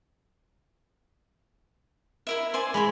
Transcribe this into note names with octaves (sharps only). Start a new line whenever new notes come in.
E4 A#4 E5
C5 D5 G#5
G#3 E4 A#5 B5